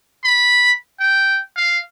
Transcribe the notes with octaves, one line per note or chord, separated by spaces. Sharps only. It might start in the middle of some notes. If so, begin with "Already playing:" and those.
B5
G5
F5